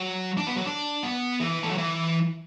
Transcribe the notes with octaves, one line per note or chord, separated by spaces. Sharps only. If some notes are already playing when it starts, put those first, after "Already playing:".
Already playing: F#3
D4
B3
F#3
D4
B3
E3
A3
F#3
E3